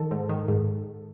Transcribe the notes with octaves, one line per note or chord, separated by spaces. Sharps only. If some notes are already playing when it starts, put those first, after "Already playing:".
Already playing: D#3 A4
G#2
D#3
G#2